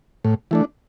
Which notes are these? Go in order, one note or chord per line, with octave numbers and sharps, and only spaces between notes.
A2
E3 A3 D4